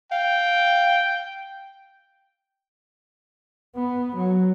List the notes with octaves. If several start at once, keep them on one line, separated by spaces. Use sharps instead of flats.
F5 G5
B3
F#3